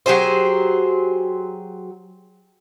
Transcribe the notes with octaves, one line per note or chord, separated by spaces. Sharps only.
F#3 G4 G#4 C5